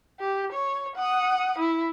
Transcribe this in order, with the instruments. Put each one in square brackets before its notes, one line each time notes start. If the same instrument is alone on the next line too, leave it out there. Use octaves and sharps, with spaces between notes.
[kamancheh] G4
C#5
F#5 D#6
E4